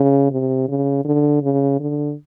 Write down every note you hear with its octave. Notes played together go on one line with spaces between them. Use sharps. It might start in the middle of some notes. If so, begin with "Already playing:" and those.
Already playing: C#3
C3
C#3
D3
C#3
D3